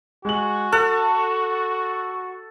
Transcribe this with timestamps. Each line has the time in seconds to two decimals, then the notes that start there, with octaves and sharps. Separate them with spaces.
0.25 G#3 F#4 F#7
0.72 A4 F#6